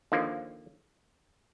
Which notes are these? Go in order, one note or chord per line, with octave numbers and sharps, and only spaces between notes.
D#2 D3 F3 A#3